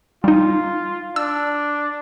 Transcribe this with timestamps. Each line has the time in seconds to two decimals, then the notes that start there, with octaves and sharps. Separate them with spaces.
0.24 G3 D#4 F4
1.16 D4 E6